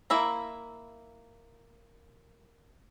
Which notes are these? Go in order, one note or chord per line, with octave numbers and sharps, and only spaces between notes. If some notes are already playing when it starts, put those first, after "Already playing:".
A#3 E4 E5 A#5